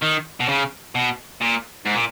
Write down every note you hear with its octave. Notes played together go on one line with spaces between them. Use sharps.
D#3
B2
C#3
B2
A#2
G#2
A#2